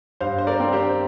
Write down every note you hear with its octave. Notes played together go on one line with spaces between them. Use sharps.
G2 C5 F5
C5
A#4 D5
C4
G4 C5